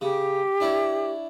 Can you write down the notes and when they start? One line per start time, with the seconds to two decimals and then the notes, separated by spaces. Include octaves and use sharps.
0.01 C#3 G4
0.60 D4 E4 C#5